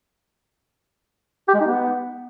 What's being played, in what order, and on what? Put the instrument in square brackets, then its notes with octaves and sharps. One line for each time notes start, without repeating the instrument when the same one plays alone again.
[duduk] G4
G#3
D#4
B3